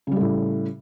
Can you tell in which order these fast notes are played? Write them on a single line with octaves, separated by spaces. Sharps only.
C#3 G3 A3 A2